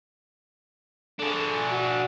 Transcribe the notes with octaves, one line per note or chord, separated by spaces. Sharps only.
D4 G#4 A4
F#4